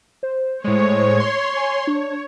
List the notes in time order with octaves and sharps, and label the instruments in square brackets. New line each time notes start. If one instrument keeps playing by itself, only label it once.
[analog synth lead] C5
[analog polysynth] A2 G#3 [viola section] C#5
[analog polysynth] C6
[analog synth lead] G#5
D4